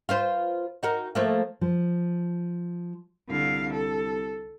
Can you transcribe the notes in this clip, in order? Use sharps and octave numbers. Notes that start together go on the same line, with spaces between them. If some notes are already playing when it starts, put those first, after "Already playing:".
F4 B4 C5
D#4 F#4 A#4
F3 A3 A#3
F3
C2 D3 F5
A4